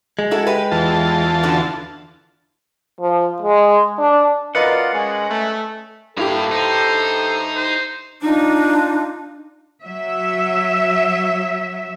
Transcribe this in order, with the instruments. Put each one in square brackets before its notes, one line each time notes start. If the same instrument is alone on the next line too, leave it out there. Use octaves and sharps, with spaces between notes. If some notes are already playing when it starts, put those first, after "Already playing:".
[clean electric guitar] G#3
[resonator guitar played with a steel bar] E4 F#4 A4
G4 B4
[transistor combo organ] E2 F4 A5
[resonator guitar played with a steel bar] D3 D4 F#4
[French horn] F3
G#3
D4
[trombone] F#2 [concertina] F4 D5 F5 [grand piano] A#4 B4 D#5 [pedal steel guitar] F#5
[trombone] G#3 [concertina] C#4
[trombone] A3
[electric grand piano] G2 E4 G4 [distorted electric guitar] A#2 F5 [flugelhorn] A4
[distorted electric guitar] D#4 [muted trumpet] C5
[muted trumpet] C5
[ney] D4 [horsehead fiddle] D#4 F4
[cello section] F#3 E5